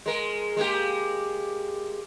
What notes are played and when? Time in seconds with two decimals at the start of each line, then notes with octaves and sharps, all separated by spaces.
0.06 G#3 A#4
0.57 G#3 A#3 G4